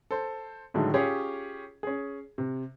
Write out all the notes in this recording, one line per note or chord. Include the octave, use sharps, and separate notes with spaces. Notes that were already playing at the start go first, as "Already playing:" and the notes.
A4 C5
A2 D3 D#3 F#3 G#3 A3
C#4 F4 G4 G#4 C#5
C#4 G#4
C3